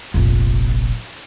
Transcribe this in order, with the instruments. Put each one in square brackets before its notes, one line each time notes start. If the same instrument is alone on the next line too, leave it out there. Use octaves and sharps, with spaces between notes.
[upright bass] F1 A#1